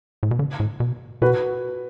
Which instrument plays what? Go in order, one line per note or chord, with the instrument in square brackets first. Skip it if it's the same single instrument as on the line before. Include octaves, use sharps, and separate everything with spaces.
[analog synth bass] A2
B2
D3
A2
B2
[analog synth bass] B2 [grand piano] F#4 B4